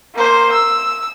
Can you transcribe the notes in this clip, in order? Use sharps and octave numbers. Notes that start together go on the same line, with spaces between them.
A#3 C5
E6